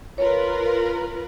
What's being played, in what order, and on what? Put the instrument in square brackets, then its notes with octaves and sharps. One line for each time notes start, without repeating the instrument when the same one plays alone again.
[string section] F4 A#4 B4 [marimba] C#5